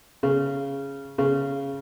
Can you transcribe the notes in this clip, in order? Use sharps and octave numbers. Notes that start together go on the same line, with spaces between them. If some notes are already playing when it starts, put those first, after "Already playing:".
C#3
C#3